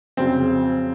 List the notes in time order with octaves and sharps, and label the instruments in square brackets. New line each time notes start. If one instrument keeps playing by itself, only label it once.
[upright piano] F2 C#3 F#3 C4